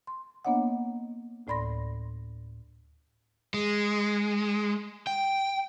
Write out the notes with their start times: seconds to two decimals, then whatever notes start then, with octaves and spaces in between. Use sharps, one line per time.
0.07 C6
0.45 A#3 B3 D4 C#5 D#5 F#5
1.47 D2 A2 D5 B5 C6 A#6
3.54 G#3
5.07 G5